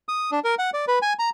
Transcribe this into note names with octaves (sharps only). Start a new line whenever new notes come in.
D#6
D4
A#4
F#5
D5
B4
G#5
A#5